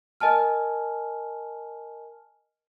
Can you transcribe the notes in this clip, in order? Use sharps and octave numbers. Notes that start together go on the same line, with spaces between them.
A#4 D#5 G#5 A5 F6